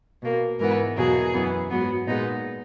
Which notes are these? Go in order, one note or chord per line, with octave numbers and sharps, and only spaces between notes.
B2 A#3
G#2 E3 B3 A#4
E2 B2 F#3 A#3 G#4
F#2 E3 B3
G#2 F#3 B3
A#2 G#3 B3 D#4